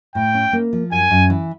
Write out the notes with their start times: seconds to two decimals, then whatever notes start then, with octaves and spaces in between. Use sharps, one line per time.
0.15 A2 G5
0.34 C#4
0.53 A#3
0.73 F3
0.91 F#2 G#5
1.11 F#2
1.30 E3